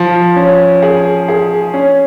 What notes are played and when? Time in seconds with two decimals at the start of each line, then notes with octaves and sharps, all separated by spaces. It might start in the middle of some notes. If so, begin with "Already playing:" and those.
Already playing: F3
0.36 C#4
0.82 G#4
1.28 G#4
1.74 C#4